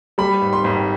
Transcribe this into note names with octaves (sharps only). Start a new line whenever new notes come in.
G3 B5
G#1
C6
G#1